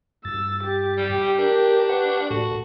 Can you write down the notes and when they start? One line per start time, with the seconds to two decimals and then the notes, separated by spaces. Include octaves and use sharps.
0.25 G2 E6 A6
0.64 G4
0.98 G3
1.39 D4 A#4
1.89 B4 F#5 C#6
2.30 A2 F#4 A4